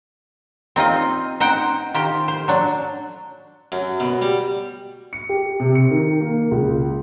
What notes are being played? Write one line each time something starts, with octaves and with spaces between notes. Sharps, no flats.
C4 D#4 F4 D#5
D#4 C5 F#5 G5
D#3 F4 G4 C5
C5
F#3 D4
F#2
B2
G3
C#7
G4
C3
C#7
D#3
A#3
C#2